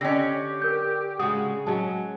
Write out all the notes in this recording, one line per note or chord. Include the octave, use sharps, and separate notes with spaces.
D3 C#4 G4 D#5 G5 A#6
A#4 G6
C#3 G#3 F#4 G#4 D#6
F#3 G#3 C#4 A5